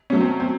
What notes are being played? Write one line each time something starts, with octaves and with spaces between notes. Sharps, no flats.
B2 F#3 A3 C#4
C4
C4